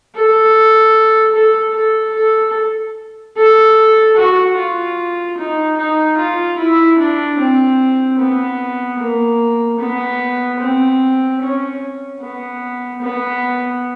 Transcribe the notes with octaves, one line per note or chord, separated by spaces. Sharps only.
A4
A4
A4
A4
A4
F#4
F4
D#4
D#4
F4
E4
D4
C4
B3
A#3
B3
C4
C#4
B3
B3